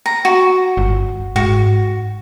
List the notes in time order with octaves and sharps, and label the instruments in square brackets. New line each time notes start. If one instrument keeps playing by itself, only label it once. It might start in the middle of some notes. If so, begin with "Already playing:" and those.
[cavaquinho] A#5
F#4
[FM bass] G1
[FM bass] G#2 [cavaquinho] F#4